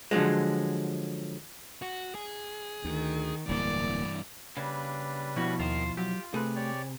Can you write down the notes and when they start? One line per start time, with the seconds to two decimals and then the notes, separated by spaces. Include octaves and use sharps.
0.11 D3 F3 F#3 G#3
1.82 F#4
2.15 G#4
2.85 D2 D#3
3.49 D1 G2 E3 A#3 D5
4.57 C#3 G3 A#3 D4 B4
5.36 B2 F3 C#4 E4 F#4
5.60 D#2 D#3 F4 A#4 C5
5.97 F#3 F4 G4
6.34 C3 A3 G#4 B4
6.56 G4 C#5 D5